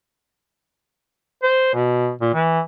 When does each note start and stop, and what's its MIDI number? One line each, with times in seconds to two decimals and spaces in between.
1.43 1.70 72
1.73 2.12 47
2.21 2.29 46
2.34 2.60 52